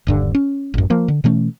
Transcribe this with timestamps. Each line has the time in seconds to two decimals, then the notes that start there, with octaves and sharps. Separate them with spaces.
0.07 D#1 G2 D3
0.35 C#4
0.74 A1 F#2
0.90 F3 A#3
1.08 D3
1.24 B2 E3 A3 C#4